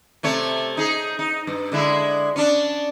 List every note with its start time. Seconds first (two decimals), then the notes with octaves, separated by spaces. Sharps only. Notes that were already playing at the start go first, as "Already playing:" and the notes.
0.23 C3 A3 C#5
0.77 D#4 G#4
1.19 D#4
1.47 G2
1.72 D3 G#3 E4
2.36 C#4 D4